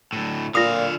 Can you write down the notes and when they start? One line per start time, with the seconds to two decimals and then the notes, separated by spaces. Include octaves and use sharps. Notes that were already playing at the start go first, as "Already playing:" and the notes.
0.13 D2 A2
0.55 A#2 D3 F4 F5 D#6